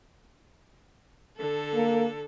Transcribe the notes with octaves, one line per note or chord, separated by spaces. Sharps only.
D3 A4
A#3